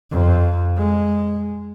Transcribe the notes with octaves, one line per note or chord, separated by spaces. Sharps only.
F2
G#3